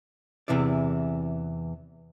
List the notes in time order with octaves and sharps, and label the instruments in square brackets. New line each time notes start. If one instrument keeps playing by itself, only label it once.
[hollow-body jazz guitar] E2 C3 E3 E4 D5